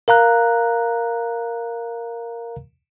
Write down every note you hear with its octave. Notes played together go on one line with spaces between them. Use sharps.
A#4 F5 A#5 F#6